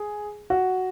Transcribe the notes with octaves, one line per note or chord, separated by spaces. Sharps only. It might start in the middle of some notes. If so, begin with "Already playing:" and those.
Already playing: G#4
F#4